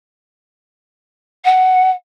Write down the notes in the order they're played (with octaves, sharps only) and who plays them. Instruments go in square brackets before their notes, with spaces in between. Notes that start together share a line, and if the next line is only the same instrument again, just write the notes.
[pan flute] F#5